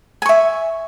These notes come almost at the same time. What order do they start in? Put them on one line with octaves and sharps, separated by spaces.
G#5 C#6 E5